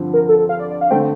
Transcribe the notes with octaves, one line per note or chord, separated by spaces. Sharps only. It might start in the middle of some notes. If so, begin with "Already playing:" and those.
Already playing: G2 D3 F3 C4
A#4
A4
A4
F5
D5
D5
F5
D3 A3 C4 G5